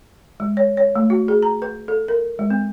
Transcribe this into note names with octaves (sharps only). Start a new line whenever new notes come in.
G#3
C#5
C#5
A3
F#4
G#4
A#5
B4
A4
A#4
G#3
C4